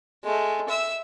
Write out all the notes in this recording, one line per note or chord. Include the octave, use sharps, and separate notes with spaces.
G#3 A3
E5 E6